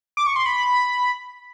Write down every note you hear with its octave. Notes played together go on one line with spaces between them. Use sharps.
D6
C#6
C6
B5